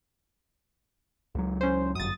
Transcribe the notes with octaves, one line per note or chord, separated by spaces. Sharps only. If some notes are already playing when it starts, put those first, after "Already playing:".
C#2 F#3
C#4 C5
G1 F#2 D#6 A6